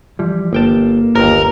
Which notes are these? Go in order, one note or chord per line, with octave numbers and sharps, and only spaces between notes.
E3 F3 G3
G1 A#3 G5 A5
G1 D#2 A#4